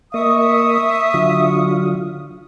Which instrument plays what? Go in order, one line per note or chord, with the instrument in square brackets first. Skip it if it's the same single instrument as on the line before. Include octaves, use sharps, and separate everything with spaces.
[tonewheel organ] A#3 D#5 [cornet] E5 [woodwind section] C#6 D#6
[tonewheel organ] D3 F#3 F4